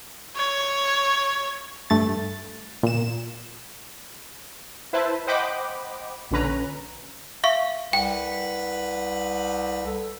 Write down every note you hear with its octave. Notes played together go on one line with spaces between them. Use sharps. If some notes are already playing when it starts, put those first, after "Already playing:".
C#5
G2 A3 A6
A#2 E7
E4 B4 C5 E5 A5
C5 D#5 F#5 G5 B5 D6
A#1 A#2 D3 C#4 B4 A#5
E5 F5 C#6
C2 B4 F#5 G5
A4